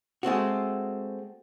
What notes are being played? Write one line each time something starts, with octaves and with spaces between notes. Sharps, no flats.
G#3 A3 C4 F#4